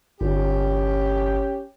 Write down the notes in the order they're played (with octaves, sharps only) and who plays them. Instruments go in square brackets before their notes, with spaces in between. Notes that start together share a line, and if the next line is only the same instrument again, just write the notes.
[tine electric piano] G1 [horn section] C#4 G4